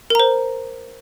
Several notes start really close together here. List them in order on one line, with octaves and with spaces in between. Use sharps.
A#4 A#5 C5